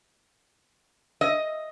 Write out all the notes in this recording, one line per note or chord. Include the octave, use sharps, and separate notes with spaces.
D#5